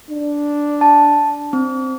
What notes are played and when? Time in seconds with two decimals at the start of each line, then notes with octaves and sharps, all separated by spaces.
0.11 D4
0.81 A5
1.53 C4